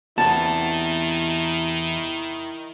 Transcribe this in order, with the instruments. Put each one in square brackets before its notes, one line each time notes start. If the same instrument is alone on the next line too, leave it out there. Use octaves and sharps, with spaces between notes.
[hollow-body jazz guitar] E2 C3 B3 [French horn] D#3 [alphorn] E4 [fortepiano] A5